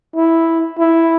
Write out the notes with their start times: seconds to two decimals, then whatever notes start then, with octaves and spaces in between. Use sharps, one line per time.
0.16 E4
0.79 E4